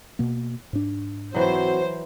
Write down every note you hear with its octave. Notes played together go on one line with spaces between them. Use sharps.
B2 A#3
G#2 D4
E3 F#3 C4 F#4 C5